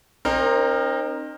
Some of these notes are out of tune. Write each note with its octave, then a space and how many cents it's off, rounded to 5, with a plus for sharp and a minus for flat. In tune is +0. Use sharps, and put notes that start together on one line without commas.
C4 +25 D#4 -35 A#4 +0